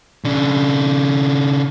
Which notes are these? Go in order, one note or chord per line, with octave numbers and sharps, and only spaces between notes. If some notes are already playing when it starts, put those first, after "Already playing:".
C#3 D4